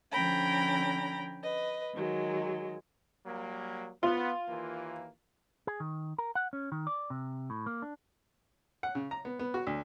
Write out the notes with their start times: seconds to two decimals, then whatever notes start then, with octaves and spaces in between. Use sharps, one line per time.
0.12 D3 F3 C#4 G5 A#5 B5
1.43 B4 D#5
1.95 D#3 F#3 G#3
3.26 F#3 G3 A#3
4.03 B3 F4
4.48 D#2 E3 A#3
5.67 G#4
5.80 D#3
6.18 A#4
6.35 F#5
6.53 C#4
6.72 D#3
6.87 D5
7.10 C3
7.50 A2
7.66 A#3
7.82 D4
8.83 F#5
8.95 C#3
9.11 A#5
9.25 B3
9.39 B3
9.54 F#4
9.67 D2